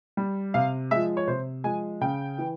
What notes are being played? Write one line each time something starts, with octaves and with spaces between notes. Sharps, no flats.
G3
C3 F5
F3 G#3 E5
C#5
C3 C5
F3 G#3 G#5
C#3 G5
E3